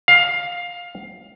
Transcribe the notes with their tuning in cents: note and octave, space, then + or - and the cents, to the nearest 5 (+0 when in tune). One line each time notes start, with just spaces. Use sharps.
F5 +15